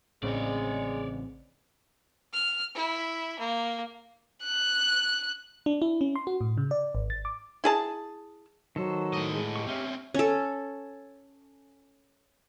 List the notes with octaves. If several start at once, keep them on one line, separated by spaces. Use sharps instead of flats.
A1 A2 C#3 G#3 C4 C#5 D5
F6
E4
A#3
F#6
D4
E4
C#4
C6
F#4
A2
C#3
D5
G#1
A6
D6
E4 G#4 A5
D#3 F#3 A4 C5
A2 D#5
G#3
G4 C#6
C4 C#4 E5
C#4 A4